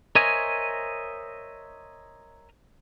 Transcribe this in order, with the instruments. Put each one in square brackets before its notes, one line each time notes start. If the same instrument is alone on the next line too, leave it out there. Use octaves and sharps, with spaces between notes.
[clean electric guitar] A#4 C5 C#5 D#5 E5 G#5